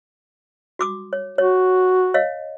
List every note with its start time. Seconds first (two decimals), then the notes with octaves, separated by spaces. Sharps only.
0.79 F#4 D6 D#6
1.13 C#5
1.38 F#4 C#5
2.14 C#5 D#5 F5